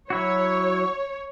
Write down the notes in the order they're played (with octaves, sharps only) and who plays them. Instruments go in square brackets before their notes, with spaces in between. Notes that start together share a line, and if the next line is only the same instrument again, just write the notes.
[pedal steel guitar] F#3 E4 F#4 [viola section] C#5